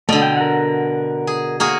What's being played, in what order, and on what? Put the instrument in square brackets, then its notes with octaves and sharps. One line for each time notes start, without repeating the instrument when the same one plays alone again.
[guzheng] B2 D3 [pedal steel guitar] A3 D5 D#5
[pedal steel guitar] G5
A#4 F#5
[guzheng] G#4
A#3 F#4 G#4